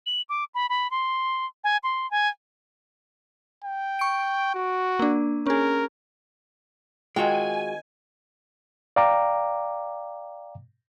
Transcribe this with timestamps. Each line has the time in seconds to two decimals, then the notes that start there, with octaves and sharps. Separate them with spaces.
0.06 F#7
0.29 D6
0.54 B5
0.70 B5
0.91 C6
1.64 G#5
1.83 C6
2.11 G#5
3.64 G5
3.99 C#6 D7
4.54 F#4
4.99 A#3 D4
5.46 C#4 G#4 A#4
7.16 D#3 G#3 C4 F4 F#4 G5 G#5
8.96 D5 F5 G5 A#5 D6